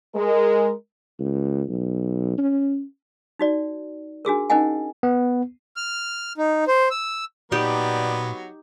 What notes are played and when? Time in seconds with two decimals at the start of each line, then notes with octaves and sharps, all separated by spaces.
0.15 G#3 A#4
1.20 C#2
1.69 B1
2.38 C#4
3.39 D#4 F#4 D5
4.25 D4 F#4 G#4 A#4
4.50 C#4 D#4 A#4 D#5 F#5 G#5
5.03 B3
5.76 F6
6.37 D#4
6.68 C5
6.91 E6
7.52 A#2 F#3 B3 D#4 G4 D5